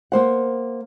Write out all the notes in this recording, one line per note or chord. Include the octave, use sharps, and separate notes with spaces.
A#3 C5 F#5